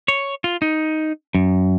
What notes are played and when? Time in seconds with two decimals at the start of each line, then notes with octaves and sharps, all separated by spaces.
0.08 C#5
0.44 F4
0.62 D#4
1.35 F#2